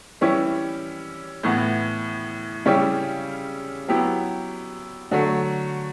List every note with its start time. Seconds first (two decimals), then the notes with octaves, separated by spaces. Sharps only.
0.21 E3 G3 C#4 E4 G4
1.43 A2 E3 B3
2.65 C#3 G3 C#4 E4 G4
3.88 F#3 B3 E4 G4
5.11 D3 F#3 A3